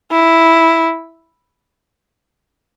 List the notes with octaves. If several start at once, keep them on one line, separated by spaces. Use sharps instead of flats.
E4